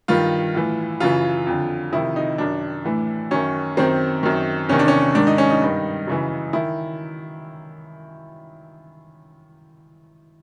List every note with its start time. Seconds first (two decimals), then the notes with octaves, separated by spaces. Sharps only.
0.08 G2 D#3 F4
0.55 A2 E3
1.00 F#2 C#3 E3 F4
1.47 F2 D3
1.92 F2 C3 D#3 E4
2.16 D#4
2.38 F#2 D#3 D4
2.85 A2 E3
3.31 F#2 D#3 C#4
3.77 F#2 D#3 C4
4.23 F#2 D#3
4.69 E2 C3 D#3 C#4
4.79 D4
4.88 C#4
5.15 G#2 D#3 D4
5.27 D#4
5.38 C#4
5.50 D#4
5.61 G2 D#3
6.07 F#2 C#3 E3
6.53 D#3 E4